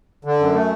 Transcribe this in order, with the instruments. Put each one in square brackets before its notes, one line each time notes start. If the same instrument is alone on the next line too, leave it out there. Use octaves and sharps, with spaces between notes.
[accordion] D3
F#2
A3